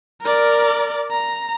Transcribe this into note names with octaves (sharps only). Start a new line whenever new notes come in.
A#4 D5
A#5